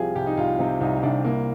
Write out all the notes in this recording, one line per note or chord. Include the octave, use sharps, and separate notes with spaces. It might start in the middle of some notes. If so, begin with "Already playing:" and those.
Already playing: C2 C3 F3 F4 G4 G#4
C2 G4
D#4
C2 F4
C3 D#4
C2 D#4
C2 D4
C2 A#3